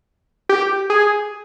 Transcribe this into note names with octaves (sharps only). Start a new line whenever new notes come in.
G4
G#4